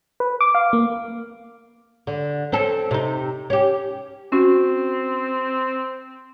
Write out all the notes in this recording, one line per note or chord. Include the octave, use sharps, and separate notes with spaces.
B4
D6
F5
A#3
D3
C4 C#4 A4
C3 D#4
C#4 G4
C4 C#4 F#4